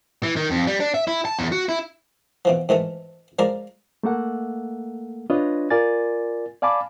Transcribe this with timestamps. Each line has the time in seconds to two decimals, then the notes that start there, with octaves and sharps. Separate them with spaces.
0.23 E3
0.36 D#3
0.51 F2
0.67 G3
0.80 D4
0.94 E5
1.08 E4
1.25 A5
1.39 E2
1.52 F#4
1.69 E4
2.45 B2 E3 F3
2.69 G#2 D#3 E3 A3
3.39 F3 G#3 A#4 D5
4.03 A3 A#3 A4 F#5
5.30 D4 F4 B4 C#5 D#5
5.70 F4 A#4 D5 G#5 A6
6.62 D5 F5 G#5 A5 B5 D6